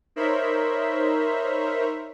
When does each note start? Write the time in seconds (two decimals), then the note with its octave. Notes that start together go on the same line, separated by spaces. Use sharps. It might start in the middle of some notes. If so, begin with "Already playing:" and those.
0.16 D#4 A#4 C5 C#5 E5 B5